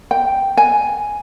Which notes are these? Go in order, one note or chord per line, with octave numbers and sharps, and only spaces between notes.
G5
G#5